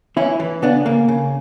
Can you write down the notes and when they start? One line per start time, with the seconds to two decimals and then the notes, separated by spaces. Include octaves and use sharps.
0.16 E3 C#4 E4
0.40 E3
0.62 C#3 B3 D4
0.86 C#3 A#3
1.09 C#3